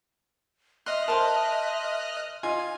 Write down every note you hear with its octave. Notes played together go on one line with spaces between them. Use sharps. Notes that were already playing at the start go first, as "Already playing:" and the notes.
D#5 E5 C6 F6 F#6
A#4 C5 A5 C6
D#4 F4 G#5